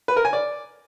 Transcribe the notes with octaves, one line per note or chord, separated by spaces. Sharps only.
B4
A#4
G#5
D5